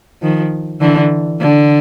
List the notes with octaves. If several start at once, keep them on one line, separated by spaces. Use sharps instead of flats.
D#3 F3
D3 E3
D3